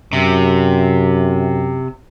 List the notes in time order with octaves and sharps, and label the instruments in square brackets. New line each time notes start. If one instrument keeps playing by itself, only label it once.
[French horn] F#2 [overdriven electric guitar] C3